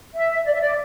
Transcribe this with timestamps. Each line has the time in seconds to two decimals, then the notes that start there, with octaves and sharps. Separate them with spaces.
0.15 E5
0.45 D5
0.53 E5
0.60 D5